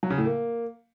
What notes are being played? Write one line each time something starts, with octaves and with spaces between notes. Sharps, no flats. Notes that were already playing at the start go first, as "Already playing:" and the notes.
F#3
C#3
A2
A#3